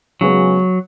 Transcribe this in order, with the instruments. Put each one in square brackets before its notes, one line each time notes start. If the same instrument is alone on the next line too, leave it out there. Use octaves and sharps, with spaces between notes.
[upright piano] C#3 G#3 B3 F#4 [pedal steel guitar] F#3